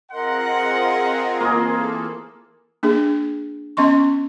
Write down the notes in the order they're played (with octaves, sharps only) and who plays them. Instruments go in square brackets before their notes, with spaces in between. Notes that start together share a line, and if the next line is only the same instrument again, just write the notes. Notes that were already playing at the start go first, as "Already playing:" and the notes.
[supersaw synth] C4 F4 G#4 [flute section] A#4 D#5 C6 [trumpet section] F#5
[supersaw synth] E3 A4 [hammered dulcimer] A#3 F4 G#4
[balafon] A#3 D4 G#4
B3 C#4 D#5 C6 C#6